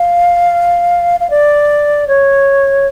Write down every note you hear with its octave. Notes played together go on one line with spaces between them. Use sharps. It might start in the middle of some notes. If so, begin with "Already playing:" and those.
Already playing: F5
F5
D5
C#5